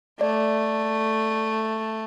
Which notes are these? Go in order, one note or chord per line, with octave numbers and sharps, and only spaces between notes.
A3 D5